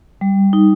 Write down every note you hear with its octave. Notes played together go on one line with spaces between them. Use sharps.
G3
D#4